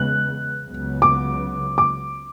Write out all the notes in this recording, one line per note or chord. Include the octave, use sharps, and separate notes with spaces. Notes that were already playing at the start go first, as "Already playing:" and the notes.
Already playing: E2 C#3 G#3 B3 F#6
C#2 C#3 F#3 B3
D6
D6